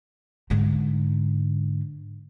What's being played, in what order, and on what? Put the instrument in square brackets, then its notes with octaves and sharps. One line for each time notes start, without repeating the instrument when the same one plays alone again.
[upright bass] G#2 D3